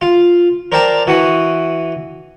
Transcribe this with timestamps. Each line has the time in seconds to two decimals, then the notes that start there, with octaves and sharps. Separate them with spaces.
0.01 F4
0.72 A#4 C5 D5 G5 A5 A#5
1.07 E3 F#4 D#6